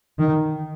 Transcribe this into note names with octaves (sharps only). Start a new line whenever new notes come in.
D#3